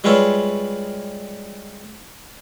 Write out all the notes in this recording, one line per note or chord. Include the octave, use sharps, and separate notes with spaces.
G3 G#3 F4 B4 C#5 E5